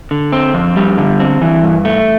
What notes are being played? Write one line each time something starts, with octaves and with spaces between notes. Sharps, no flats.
D3
C4
F2
G3
D3
C4
E3
G2
A3